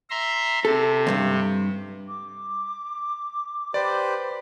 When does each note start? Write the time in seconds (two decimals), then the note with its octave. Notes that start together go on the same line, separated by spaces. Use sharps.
0.10 E5 A#5 C6
0.65 C3 A4
1.07 D2 G2
2.07 D6
3.74 G4 B4 C5 D5